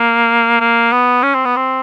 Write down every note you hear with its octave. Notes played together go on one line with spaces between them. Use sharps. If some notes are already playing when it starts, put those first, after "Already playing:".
Already playing: A#3
A#3
B3
C#4
C4
B3
C4